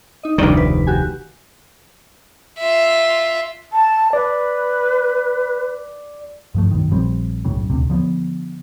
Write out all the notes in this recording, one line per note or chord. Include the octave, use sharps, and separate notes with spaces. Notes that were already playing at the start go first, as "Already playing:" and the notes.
D#4 D#5
F1 D2 D#3 G3 D4 D5
B4
F#4 G4 G#5
F4 E5
A5
B4 D5
G2 F3 A3
F#2 B2 D#3
A#1 F3 G3 C4
B1 F#2 A2 C#3
D#1 D2 C3
D3 F3 G3 B3